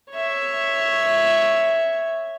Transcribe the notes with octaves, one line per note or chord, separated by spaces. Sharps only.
C#5 E5